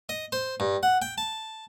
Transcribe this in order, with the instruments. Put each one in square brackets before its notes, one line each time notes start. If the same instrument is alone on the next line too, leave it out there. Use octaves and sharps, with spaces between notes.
[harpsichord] D#5
C5
G2
F#5
G5
A5